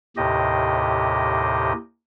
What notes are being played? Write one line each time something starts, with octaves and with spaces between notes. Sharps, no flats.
D#2 A2 C3 G4 D#5